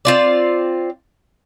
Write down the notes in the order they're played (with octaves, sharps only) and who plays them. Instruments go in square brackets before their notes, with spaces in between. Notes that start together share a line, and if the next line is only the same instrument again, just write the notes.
[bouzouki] C4 F4 D5